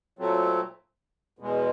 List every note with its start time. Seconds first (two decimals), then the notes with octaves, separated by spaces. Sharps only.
0.19 A#2 F#3 A3 C4
1.39 E2 B2 G#3